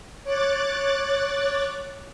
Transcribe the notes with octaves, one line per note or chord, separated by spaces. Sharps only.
C#5 D6 F#6 A6